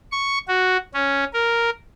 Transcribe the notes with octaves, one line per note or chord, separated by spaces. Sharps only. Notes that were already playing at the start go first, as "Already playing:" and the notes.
C#6
F#4
C#4
A#4